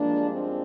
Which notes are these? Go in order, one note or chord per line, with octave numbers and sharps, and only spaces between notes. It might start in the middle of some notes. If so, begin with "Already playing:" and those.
Already playing: G2 F3 G#3 A#3 D4
C4